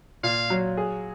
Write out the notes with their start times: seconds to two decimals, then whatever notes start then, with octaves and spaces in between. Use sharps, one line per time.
0.23 A#2 F5
0.50 F#3
0.77 G#4